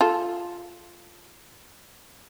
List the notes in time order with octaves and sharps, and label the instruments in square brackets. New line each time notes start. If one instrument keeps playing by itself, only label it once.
[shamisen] F4 A4